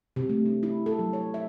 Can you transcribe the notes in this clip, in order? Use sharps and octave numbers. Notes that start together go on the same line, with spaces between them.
C3
A3
D4
E4
A4
F#3
C#5
E5